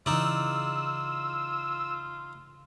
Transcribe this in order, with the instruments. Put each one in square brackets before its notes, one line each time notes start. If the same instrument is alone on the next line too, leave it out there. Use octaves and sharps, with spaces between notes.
[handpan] C#3 E3 [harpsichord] D#4 D5 [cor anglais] F4 [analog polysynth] E6